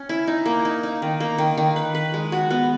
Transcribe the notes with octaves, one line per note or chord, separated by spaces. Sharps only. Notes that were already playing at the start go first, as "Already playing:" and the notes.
Already playing: C#4
E4
D#4
A#3
D#4
D#4
D#3
A#3
D#3
D#3
B4
B4
G#3
F#4
B3